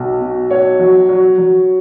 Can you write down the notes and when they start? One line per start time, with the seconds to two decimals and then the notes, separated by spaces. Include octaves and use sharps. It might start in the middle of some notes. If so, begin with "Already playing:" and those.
Already playing: B1
0.21 B2
0.50 B1 C#5
0.79 F#3
1.09 F#3
1.38 F#3